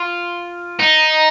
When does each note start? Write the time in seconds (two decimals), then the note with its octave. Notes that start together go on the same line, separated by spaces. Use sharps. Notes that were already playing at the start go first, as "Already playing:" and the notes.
Already playing: F4
0.80 D#4